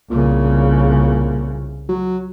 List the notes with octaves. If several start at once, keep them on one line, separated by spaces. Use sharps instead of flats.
C2 A#2 C#3
F#3